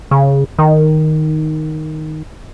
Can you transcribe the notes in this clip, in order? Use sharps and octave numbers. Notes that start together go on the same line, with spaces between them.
C#3
D#3